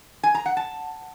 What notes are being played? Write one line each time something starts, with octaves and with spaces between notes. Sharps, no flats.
G#5
A#5
F#5
A5